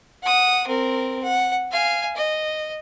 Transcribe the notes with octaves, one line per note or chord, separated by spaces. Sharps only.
F#5 D#6
C4 A#4
F#5
F5 G#5
D#5